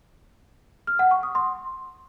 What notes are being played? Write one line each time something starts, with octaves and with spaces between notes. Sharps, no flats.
F6
F#5
C#6
D#6
C6